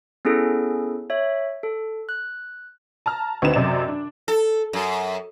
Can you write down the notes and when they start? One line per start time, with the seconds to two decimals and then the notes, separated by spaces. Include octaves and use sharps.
0.25 B3 C#4 E4 G#4 A4
1.10 C#5 E5
1.63 A4
2.09 F#6
3.06 A5 A#5 F6
3.42 D2 C4 D#4 B4 E7
3.54 F#2 C3 D5 D#5 E7
3.88 D4
4.28 A4
4.73 F#2